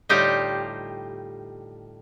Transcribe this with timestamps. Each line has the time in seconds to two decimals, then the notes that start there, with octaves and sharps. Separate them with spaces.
0.09 A2 D3 G3 D#4 F4 G4